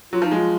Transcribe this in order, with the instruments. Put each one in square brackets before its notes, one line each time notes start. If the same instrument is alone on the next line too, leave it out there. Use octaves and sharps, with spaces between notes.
[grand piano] F#3 [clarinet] F4
[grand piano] F3
[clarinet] D#4
[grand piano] G#3
[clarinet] F4